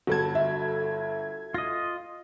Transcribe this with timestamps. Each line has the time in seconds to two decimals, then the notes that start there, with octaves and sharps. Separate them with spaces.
0.07 G1 G2 F#4 A4 A5 G#6
0.35 E5
1.54 F4 D#5 A#6